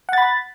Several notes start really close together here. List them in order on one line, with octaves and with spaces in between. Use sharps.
F#5 A6 B5